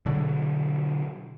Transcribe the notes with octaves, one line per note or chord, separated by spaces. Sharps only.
B2 D3 F#3